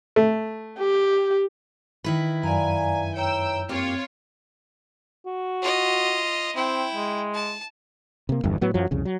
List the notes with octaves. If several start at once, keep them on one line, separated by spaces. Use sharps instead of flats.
A3
G4
D#3 E4 B4
F#2 D5 F5 G#5 A#5
C#5 G5 A#5 E6
A#3 C4 F4 G4 C#5
F#4
F4 D#5
C4 E4 G5
G#3
A5
C3 A#3
G1 E2 G2
A2 F#3 B3
F#2 F3 F#3
C2 F2 C#3
F#3